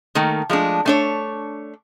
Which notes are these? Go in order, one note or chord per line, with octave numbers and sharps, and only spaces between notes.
D#3 A3 A#3
F3 G#3 A3 D4
A3 D4 C#5